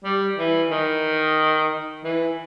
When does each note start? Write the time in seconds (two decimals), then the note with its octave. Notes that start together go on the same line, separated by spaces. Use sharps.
0.04 G3
0.38 E3
0.71 D#3
2.04 E3